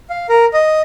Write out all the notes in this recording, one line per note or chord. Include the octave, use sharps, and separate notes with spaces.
F5
A#4
D#5